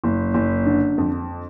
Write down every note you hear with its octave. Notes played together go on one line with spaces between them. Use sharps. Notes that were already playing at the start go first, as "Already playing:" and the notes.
F#1
F#1
D3
F2